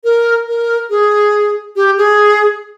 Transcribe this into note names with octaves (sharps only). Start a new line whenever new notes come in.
A#4
A#4
G#4
G4
G#4